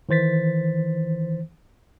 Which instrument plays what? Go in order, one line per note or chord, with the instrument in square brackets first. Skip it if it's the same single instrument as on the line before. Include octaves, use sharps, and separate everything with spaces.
[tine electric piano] D#3 E3 C5 A6 B6